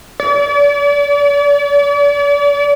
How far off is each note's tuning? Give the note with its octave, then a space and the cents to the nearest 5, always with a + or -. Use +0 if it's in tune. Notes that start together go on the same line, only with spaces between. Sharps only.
D5 -40